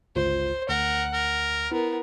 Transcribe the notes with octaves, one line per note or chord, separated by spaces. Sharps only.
G1 C#2 F4 C5
D2 A#4 F#5
A#4
B3 E4 A#4